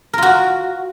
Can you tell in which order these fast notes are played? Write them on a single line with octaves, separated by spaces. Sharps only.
A#4 F4 F#4